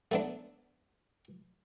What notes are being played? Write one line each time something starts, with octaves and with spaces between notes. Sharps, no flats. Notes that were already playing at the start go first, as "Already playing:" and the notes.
A3 B3 D4